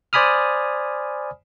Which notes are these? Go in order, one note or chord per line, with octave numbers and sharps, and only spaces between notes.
C5 D5 G#5 B5 D#6 F6